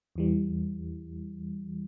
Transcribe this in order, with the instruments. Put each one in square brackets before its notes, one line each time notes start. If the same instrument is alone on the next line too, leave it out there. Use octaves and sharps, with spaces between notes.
[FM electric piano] E2 E3 G3